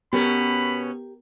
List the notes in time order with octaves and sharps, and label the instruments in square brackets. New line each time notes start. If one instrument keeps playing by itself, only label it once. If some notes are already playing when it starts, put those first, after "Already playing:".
[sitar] B2 C#4 [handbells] B3 [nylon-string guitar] G4 A#4 [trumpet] B5